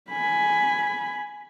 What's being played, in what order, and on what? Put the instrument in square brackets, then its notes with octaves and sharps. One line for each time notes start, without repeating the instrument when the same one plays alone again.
[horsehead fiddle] G#5 B5